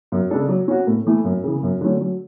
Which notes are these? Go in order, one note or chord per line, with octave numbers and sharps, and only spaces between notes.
F#2
C#3 G#3 D4 A4
F#3
C#4 F#4
A2
E3 A3 E4
F#2
C#3 E3
F#2
D3 F#3 A3 C#4
F#3